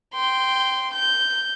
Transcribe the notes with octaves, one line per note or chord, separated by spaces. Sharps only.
G5 C6
G6